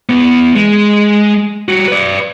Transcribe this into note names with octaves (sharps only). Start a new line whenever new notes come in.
E3 B3
G#3
G3 F#4
B4 D5